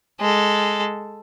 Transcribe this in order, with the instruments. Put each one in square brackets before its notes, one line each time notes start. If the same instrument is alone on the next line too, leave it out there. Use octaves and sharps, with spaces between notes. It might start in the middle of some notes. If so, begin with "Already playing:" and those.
[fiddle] G#3 A4